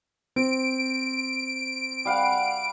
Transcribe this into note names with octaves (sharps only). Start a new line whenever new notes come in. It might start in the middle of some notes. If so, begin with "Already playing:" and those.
C4 D7
G3 F5 F#5